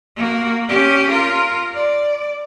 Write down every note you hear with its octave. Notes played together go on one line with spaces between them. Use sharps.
A#3 F#4
C#4 G4
F4 A#4
D5